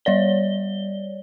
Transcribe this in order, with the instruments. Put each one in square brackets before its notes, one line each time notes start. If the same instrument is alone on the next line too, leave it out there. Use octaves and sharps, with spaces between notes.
[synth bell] G3 C#5 D5 G7